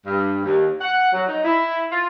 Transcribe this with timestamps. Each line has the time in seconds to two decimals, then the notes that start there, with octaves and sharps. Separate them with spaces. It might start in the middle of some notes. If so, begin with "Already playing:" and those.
0.06 G2
0.44 D#2
0.81 F#5
1.11 F#3
1.27 D#4
1.45 E4
1.91 F4